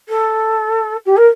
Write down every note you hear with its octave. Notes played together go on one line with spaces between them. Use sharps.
A4
G4
A#4